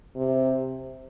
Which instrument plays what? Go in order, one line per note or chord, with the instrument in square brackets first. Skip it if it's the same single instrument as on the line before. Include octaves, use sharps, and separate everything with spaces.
[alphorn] C3